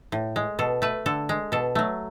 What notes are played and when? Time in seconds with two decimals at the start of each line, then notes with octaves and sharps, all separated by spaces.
0.12 A2
0.36 G#3
0.59 B2 A4
0.82 A3 B4
1.06 D3 A4
1.29 G#3
1.52 B2 A4
1.75 F#3 A3